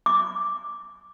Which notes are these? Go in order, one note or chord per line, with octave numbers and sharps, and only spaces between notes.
D6